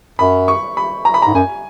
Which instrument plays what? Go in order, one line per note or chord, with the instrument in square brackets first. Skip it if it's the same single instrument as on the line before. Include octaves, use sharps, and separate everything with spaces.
[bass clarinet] F#2 [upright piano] B5
[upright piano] C#6
B5
A#5
B5
A#5
[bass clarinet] G#2
[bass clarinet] F#2 [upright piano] G#5